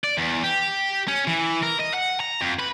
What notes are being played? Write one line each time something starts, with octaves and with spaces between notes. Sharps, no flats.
D5
E2
G4
C#4
E3
A#4
D#5
F#5
A#5
F2
B4